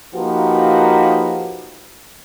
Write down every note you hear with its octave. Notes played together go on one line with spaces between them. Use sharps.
F3 A#3 D#4 F#4 G4 B4